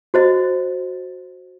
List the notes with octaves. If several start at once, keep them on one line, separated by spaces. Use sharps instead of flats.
F#4 C5 D#5